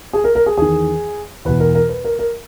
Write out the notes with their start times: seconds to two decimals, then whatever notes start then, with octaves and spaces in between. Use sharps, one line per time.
0.13 G#4
0.24 A#4
0.35 A#4
0.46 G#4
0.57 E2 D#3 G#4
1.45 E2 B2 B4
1.60 A#4
1.75 A#4
1.89 B4
2.04 A#4
2.19 A#4